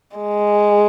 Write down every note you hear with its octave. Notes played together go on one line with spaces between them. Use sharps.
G#3